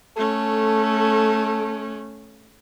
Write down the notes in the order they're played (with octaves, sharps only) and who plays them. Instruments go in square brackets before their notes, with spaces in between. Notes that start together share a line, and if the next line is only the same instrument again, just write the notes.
[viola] A3 C#4 [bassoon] A4